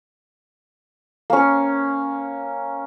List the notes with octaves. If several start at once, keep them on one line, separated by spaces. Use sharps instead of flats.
A#3 C#4